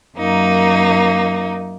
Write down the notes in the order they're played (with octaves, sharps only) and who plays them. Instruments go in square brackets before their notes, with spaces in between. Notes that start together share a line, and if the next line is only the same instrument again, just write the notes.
[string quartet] F#2 A#3 D#4